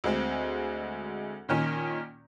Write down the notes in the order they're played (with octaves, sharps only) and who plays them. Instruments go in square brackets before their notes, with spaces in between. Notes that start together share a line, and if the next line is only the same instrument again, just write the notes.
[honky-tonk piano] D2 G#3 C4
A#2 D#3 C#4